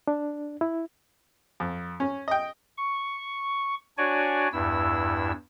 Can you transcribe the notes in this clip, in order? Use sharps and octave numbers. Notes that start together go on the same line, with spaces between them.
D4
E4
F2
C#4
D#5 G5
C#6
D4 F#4 C#5 D5 G#5
E2 G2 E4 E6